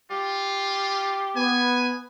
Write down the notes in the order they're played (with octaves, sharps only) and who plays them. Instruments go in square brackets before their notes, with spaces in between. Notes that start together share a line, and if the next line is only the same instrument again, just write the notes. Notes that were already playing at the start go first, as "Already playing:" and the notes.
[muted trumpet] F4 [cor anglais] G4
[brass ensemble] B3 [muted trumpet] G#5